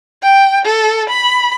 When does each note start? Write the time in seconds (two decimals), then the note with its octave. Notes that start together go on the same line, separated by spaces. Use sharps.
0.23 G5
0.65 A4
1.09 B5